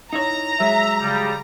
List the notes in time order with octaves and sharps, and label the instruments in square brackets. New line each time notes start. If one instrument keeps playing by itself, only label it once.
[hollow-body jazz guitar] D#4 E4 C#5 [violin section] A#5
[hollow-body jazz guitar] F#3 G#3 [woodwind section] E5
[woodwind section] C#3 G3